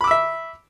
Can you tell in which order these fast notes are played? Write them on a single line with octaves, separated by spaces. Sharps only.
B5 D6 E6 E5